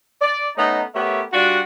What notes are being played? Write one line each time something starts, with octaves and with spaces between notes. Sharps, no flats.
D5
A3 B3 C#4 D#4
A3 B3 G4 A#4 C#5 E5
G3 D4 F4 F#4